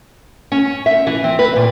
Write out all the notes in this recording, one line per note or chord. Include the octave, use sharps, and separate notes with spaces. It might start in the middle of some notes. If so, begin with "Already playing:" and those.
C#4
E5
E3
C4
B4
A#2